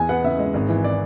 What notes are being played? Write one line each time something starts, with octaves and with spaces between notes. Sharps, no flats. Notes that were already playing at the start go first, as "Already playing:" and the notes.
Already playing: E2 G#5
B3 F#5
C#3 E5
G#3
G#1
E3
D5